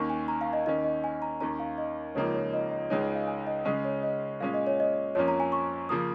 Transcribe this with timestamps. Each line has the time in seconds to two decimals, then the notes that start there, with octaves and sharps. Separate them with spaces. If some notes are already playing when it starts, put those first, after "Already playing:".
Already playing: D#2 D#3 A#3 C#4 C#6
0.10 G#5
0.28 A#5
0.41 F5
0.53 D#5
0.66 D#2 D#3 C#4 D#5
0.84 D#5
1.04 G#5
1.22 A#5
1.41 D#2 D#3 C#4 A#5
1.60 F5
1.78 D#5
2.15 C#2 C#3 F3 A#3 D#4 C#5
2.34 C#5
2.53 D#5
2.71 D#5
2.90 C#2 C#3 G#3 D#4 C#5
3.03 D#5
3.15 F5
3.27 G#5
3.47 D#5
3.65 C#3 G#3 C#4 D#5
3.84 C#5
4.03 D#5
4.40 A#2 G#3 C#4 F5
4.54 D#5
4.67 C#5
4.80 D#5
5.15 F2 F3 A#3 C#4 C#5
5.28 A#5
5.40 G#5
5.52 C#6
5.89 C#3 F3 A#3 D#6